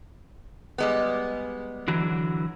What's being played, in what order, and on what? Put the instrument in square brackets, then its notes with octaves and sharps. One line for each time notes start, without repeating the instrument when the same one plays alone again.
[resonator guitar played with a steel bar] G3 G#3 B3
[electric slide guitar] D3 E3 F#3